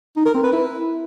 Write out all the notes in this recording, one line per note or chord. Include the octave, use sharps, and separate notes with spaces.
D#4
A#4
C4
B4
E4